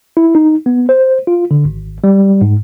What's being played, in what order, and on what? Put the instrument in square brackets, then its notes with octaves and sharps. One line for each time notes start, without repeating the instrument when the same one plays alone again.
[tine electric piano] E4
D#4
B3
C5
F4
D3
G#1
G3
G#2